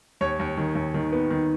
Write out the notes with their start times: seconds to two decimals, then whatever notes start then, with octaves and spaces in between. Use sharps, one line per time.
0.21 D#2 C#5
0.40 D#2
0.57 D#3
0.75 D#2
0.94 D#3
1.12 B3
1.30 D#3